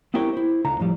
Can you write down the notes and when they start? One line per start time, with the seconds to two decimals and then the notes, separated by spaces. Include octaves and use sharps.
0.14 B3 C4 E4 G4 A#4 C#5
0.33 E4 C5
0.65 C#2 D3 A#5
0.80 A2 F3 G3